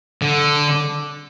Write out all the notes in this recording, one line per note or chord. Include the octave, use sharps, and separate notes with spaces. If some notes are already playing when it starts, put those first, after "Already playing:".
D3